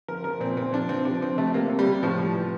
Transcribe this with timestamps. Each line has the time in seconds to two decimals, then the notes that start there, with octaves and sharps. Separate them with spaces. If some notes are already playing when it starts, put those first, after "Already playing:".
0.08 F3 A#4
0.24 F3 A#4
0.40 A#2 C4
0.57 A#2 C4
0.73 F3 D4
0.89 F3 C4
1.05 C3 D4
1.22 F3 C4
1.38 C3 A3
1.54 C3 A#3
1.70 C3
1.79 G3
1.87 C3
2.03 A2 F3
2.19 A2
2.36 E3